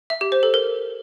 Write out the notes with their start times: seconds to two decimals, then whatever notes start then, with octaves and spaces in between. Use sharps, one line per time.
0.10 E5
0.21 G4
0.32 C5
0.43 A4
0.54 A#4